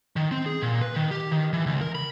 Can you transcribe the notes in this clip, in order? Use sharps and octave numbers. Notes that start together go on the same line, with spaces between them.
D#3
C4
G#4
A#2
B4
D#3
G4
D#3
E3
C#2
A#4
B5